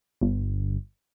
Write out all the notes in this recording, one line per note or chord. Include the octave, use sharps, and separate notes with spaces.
G1